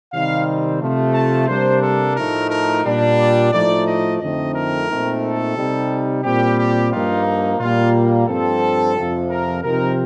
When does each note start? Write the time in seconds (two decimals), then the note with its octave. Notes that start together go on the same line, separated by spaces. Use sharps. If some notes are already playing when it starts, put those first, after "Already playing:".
0.12 C3 D#3 G3 C4 D#4 F5
0.80 C3 F3 A3
1.15 A5
1.48 C3 G3 A#3 D4 C5
1.83 A4
2.16 A2 F3 A3 D#4 A#4
2.50 A#4
2.84 A#2 G3 D4
3.18 D5
3.53 A2 F3 A3 D#4 D5
3.86 D#5
4.20 F2 D3 A3 C4 D#4 D#5
4.54 A#4
4.89 A#2 A3 C4 D#4
5.22 A4
5.56 C3 G3 C4 D#4
6.24 A#2 G3 C4 G4
6.58 G4
6.92 G2 F3 A#3 D#4 F4
7.59 A#2 G3 A#3 F4
8.28 G2 F3 C4 A4
8.96 F2 C3 F3
9.31 A#4
9.63 C3 F3 C4 D#4 A#4